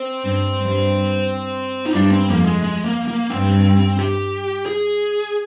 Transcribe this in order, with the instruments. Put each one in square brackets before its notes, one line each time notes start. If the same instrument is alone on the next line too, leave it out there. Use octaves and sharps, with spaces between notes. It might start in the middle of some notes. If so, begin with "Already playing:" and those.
Already playing: [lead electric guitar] C4
[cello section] G2
G2
[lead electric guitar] D#4
[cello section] G2 [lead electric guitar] D4
[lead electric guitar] C4
[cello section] F2 [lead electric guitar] A#3
[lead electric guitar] G#3
G#3
A#3
A#3
[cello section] G2 [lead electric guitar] C4
[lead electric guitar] G4
G#4